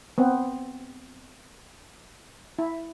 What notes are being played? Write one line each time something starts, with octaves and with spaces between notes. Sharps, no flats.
B3 C4
E4